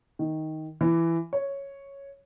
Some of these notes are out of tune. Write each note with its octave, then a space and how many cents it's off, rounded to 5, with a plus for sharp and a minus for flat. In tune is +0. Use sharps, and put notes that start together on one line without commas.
D#3 +10
E3 +15
C#5 +0